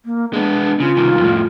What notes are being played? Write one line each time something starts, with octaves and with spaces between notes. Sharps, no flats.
A#3
G#3 B3 D4
C#3 F4
C2 D#3
F2 A2